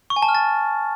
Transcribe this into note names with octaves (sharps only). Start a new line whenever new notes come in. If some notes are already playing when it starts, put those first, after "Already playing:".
C#6
G#5
A5
F6
A6